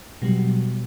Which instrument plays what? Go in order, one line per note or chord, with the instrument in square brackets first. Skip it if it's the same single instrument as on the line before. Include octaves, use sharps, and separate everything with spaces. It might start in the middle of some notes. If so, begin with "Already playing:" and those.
[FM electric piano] B2 F#3 G3